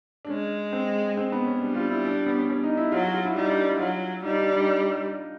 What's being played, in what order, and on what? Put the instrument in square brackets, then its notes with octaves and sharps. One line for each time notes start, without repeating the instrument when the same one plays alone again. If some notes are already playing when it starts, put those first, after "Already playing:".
[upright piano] D4
[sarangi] G#3 [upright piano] C#4
[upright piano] C4
C4
B3
C#4
[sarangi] G3 [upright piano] D4
[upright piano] F4
E4
D4
B3
C#4
C#4
D#4
E4
[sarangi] F#3 [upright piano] F4
[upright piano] F#4
F4
E4
[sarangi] G3 [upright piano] D#4
[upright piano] D4
E4
[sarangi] F#3 [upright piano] F4
[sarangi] G3 [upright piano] D#4
[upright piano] D4
D#4